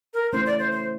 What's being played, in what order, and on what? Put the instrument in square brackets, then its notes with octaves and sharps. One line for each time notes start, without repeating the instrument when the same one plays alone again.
[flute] A#4
[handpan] A3 C#4 E4 [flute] C5
[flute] D5
C5
C5